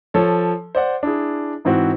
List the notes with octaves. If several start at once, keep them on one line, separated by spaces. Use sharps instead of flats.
F3 A4 C#5
C5 D5 F#5
D4 E4 G#4
G#2 E3 C4 F#4